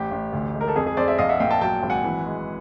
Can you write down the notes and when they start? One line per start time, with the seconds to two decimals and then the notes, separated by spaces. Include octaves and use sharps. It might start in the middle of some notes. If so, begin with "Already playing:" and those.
Already playing: A1 G4
0.11 A1
0.33 D2
0.55 G#3
0.61 A#4
0.68 A4
0.76 F2 G#4
0.87 G#4
0.97 F2 C5 D5
1.07 D5 E5
1.18 A#1 D#5 F5
1.29 E5 F#5
1.40 A#2 F5 G5
1.51 G5 A5
1.61 F#3 G5 A5
1.83 G#1
1.90 F#5 G#5
2.04 E3
2.26 G#3